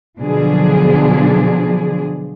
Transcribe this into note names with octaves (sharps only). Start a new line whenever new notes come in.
B2 D3 F3 F#3 D4 G#4